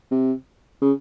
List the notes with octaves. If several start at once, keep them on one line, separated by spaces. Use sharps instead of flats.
C3
C#3